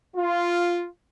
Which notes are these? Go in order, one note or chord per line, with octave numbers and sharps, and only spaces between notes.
F4